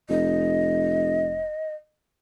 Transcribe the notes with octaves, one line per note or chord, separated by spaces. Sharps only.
F1 D#5